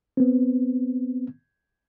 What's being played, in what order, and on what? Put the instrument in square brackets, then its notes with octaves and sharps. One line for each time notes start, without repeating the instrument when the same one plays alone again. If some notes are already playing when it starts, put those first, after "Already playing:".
[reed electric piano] B3 C4